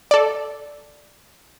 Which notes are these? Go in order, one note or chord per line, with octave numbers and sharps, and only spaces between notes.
A4 D5